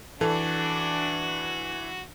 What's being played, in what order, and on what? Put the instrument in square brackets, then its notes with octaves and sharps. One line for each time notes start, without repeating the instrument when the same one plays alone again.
[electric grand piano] E3 [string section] D4 [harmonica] F#4 [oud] A4